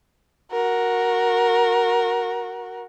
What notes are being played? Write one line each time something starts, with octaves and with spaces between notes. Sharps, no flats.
F#4 A#4